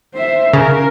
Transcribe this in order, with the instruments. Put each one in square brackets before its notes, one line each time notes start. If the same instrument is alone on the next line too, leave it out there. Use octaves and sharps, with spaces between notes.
[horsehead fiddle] C5 E5
[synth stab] C#3 [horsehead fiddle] A#4